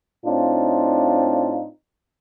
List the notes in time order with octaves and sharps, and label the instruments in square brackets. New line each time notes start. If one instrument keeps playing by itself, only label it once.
[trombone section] A2 C4 D4 D#4 F4